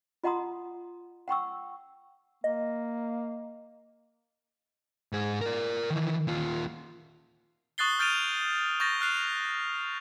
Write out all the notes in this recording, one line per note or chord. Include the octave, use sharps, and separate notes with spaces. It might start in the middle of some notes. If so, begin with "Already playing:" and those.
F4 D#5 F#5 A#5 C6 D#6
F#5 G5 C#6 E6
A#3 D#5
G#2 G#4
A#4 D5
D#3 E3
D#2 F4
C#6 D#6 F#6 A6 C7 G7
F6 G6 A6 D7 D#7 F7
C#6 G6 A6 A#6
F6 F#6 C7 F7